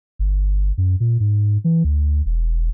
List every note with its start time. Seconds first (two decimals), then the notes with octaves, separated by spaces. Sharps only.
0.19 G1
0.78 F#2
1.00 A#2
1.20 G#2
1.64 E3
1.84 D2
2.26 E1